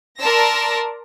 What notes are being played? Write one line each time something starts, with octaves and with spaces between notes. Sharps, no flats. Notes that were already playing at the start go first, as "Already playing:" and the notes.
A#4 D5 A5 C6 E6 A#6